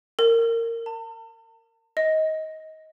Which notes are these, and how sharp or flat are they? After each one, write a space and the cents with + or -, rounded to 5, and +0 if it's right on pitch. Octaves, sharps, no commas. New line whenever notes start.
A#4 -20
A5 +45
D#5 +20